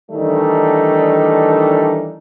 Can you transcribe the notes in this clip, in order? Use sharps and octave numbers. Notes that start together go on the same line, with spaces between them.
D#3 E3 G3 A3 D4 D#4